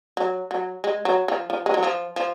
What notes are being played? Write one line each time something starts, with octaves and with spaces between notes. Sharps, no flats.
F#3
F#3
G#3
F#3
F3
F3
G#3
F#3
F3
F3